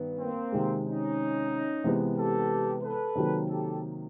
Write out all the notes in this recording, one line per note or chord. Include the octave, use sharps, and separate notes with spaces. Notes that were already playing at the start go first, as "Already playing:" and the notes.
Already playing: G2 D#3 G3 B3
A#3 C4
C3 D#3 G#3
C#4 D#4
C3 E3 G#3 B3
G4 A4
A4 B4
C3 D#3 F#3 A#3
G4 A4